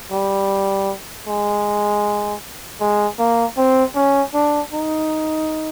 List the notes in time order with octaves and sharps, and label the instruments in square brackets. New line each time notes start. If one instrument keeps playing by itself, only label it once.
[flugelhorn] G3
G#3
G#3
A#3
C4
C#4
D4
D#4